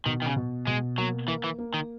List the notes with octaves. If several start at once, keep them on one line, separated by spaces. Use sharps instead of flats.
B2 D#3
D#3
C#3
B2
B2 G#3
F#3 A#3
E3 A#3
E3
A#3
D#3